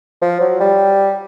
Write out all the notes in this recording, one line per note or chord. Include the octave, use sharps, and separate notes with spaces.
F3
F#3
G3